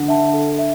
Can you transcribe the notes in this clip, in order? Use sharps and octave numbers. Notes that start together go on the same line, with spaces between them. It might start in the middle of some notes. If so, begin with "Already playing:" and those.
Already playing: D3
E5 A5
A4
E5